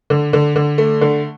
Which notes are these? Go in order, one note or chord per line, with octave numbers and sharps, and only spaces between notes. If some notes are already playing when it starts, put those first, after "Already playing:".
D3
D3
D3
A3
D3